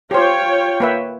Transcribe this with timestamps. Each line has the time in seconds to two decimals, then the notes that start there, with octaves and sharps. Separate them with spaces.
0.11 F4 G4 C5 C#5 G5
0.80 A#3 B4 E5